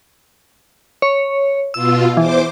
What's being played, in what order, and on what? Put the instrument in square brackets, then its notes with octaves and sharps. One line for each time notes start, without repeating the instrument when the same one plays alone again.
[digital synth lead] C#5
[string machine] B2 F4 [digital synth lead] E6
[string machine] E2 C5 D6 [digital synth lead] E3